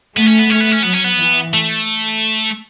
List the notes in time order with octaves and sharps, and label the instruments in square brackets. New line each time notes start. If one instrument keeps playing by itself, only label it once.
[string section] A3 [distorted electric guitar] B3
[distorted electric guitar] C#4
B3
[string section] A3 [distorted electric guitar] C#4
[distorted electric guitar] B3
C#4
[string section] F#3 [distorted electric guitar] B3
[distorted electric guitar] C#4
B3
[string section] E3
[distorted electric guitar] A3